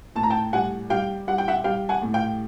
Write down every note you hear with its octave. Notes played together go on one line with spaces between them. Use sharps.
A2 A5
A#5
G5 A5
G3 F#5 G#5
G3 F5 G5
G3 F#5
G5
E5 F#5
G3 F5 G5
F#5 G#5
A2
F5 G5